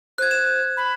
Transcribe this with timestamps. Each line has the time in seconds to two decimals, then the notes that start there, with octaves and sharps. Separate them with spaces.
0.18 C5 F#6 G#6
0.31 E7
0.77 B5